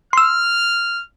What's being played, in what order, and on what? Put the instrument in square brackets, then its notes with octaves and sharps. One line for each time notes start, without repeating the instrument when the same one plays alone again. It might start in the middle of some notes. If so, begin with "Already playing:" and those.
[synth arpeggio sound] C6 E6 [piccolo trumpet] F6